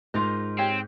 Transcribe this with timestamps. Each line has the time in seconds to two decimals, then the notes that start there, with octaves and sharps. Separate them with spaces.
0.14 G#2 F4 A#4 D#5
0.58 C4 G4 C#5 G5